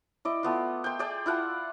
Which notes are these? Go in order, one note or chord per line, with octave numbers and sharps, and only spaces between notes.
E4 D5 D#5
A3 B3 F4
G5 C6
G#4 D5 G5 A5
E4 F4 F#5 A5